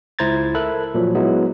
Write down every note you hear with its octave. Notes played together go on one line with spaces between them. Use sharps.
C#2 E4 C5 A#5 G#6 A6
A4 A#4 E5 B5 F#6
A#2 F3 F#3
F#3 G#3 B3 E4